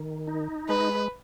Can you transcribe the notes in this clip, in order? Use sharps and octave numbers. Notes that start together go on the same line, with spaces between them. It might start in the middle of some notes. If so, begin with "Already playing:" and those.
Already playing: D#3
D#4
G#3 B4